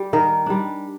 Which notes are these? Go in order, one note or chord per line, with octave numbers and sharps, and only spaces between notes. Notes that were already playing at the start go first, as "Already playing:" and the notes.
Already playing: G3
D#3 A#4
G3 D4